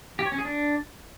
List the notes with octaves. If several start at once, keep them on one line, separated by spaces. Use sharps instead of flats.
G4
C#5
C#4
G#4
D4